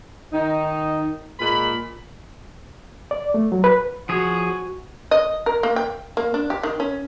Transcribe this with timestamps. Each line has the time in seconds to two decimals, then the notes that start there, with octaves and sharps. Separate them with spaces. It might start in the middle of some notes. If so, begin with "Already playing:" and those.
0.32 D#3 D#4
1.39 A#2 G#3 B5
3.11 D5
3.34 A3
3.52 F#3
3.64 B4
4.09 F3 F#4 G#4 C#5
5.11 D#5
5.46 A#4
5.63 A#3
5.76 G5
6.17 A#3
6.34 D4
6.50 G4
6.63 D#3
6.80 C#4